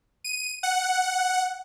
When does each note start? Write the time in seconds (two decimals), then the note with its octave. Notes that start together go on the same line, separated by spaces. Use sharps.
0.24 D#7
0.63 F#5